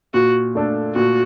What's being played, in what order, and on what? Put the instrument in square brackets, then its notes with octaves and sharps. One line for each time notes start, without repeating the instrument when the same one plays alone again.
[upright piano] A#2 [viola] F#4
[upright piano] A3 D4 A4
[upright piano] A#2 [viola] F#4